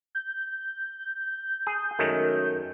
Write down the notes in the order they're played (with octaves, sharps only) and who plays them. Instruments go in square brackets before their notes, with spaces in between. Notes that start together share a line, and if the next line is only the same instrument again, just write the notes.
[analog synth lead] G6
[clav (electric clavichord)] G#4
[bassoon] F#2 [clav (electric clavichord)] D#3 G#3 A3